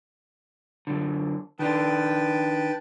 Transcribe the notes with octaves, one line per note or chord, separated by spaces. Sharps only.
F#2 D3
D#3 D4 B4 G5 A5